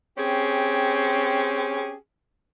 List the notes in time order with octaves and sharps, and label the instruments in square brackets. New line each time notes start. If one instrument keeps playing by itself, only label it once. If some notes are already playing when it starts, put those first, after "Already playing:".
[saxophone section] C4 C#4 G4 G#4